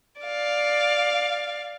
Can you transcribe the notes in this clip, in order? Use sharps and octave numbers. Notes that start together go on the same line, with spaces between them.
D5 F5